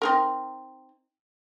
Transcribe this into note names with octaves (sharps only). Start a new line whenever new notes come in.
C4 D#4 A#4